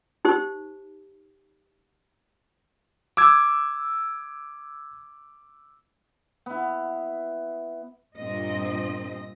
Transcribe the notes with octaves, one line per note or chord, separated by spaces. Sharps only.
D#4 G4 C5
D6 E6 G#6
B3 E4
G2 A#2 C4 D#5